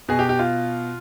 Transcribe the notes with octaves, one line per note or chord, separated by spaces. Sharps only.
B2 G#4
G4
G4
F4